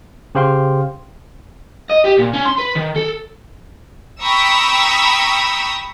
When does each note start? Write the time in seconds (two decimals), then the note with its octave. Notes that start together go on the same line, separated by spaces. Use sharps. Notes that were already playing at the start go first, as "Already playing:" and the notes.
0.35 C#3 G4 C5 F5 G5 C6
1.90 D#5
2.04 G4
2.18 A#2
2.33 C#4
2.45 C6
2.58 B4
2.76 D#3
2.96 A4
4.21 G5 A#5 B5 C#6 D#6 E6